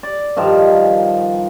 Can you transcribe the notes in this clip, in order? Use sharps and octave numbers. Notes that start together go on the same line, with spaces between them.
D5
G2 D#3 F3